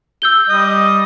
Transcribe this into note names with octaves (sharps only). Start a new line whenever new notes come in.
E6 G6 G7
G3 D#5